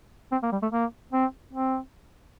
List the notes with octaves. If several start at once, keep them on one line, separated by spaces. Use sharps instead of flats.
C4
A#3
G3
A3
A#3
C4
C4